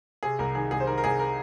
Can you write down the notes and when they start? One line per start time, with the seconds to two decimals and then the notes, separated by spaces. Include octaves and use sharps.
0.23 C3 G#4
0.39 C2 A#4
0.55 D#3 G#4
0.71 C2 G#4
0.80 C5
0.87 D#3 A#4
0.98 A#4
1.04 C2 G#4
1.19 A#4